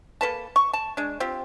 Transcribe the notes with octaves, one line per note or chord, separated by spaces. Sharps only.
A#3 A4 B4 A5
C#6
A5
G#3 D4
C4 F4 G4